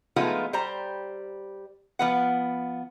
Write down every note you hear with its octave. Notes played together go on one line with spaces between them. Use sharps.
F3 G#3 A3 B3 D#4 F4
G3 C5 A#5
F3 B3 F#5